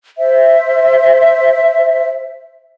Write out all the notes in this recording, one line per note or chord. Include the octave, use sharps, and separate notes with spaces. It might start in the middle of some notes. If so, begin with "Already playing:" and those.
C5 E5